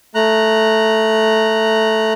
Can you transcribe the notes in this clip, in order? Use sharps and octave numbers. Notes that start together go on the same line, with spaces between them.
A3 A#5 F#6